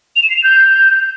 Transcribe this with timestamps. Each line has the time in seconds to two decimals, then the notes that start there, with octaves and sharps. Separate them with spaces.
0.16 F7
0.23 E7
0.30 C7
0.37 F7
0.44 G6